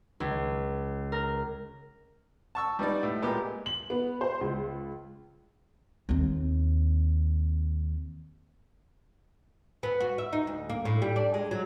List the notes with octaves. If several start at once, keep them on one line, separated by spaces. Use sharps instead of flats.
C#2
A#4
A5 C#6 E6
G3 B3 D#4 D5
A2
A#2 G#3 A#3 B3 G4
F#7
B3
C5
C#2
D#2 C4
B3
F#4
E5
D#4
D2
A#3
A2
G3
D4
G#3
F#3